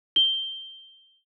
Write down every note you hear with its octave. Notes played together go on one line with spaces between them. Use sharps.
G7